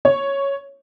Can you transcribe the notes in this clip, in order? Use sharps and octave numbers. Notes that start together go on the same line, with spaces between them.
C#5